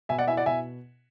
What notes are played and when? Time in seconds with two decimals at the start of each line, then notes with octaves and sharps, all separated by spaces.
0.09 B2 E5 G#5
0.18 D5 F#5
0.28 E4 E5 G#5
0.37 D5 F#5
0.46 B2 E5 G#5